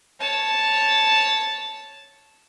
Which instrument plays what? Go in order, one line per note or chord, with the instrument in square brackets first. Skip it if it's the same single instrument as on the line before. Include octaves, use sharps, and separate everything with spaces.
[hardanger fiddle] C#5 A5